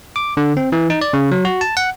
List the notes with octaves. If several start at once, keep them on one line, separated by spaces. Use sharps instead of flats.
D6
D3
C4
E3
D#4
D5
C#3
F#3
F#4
A5
F#5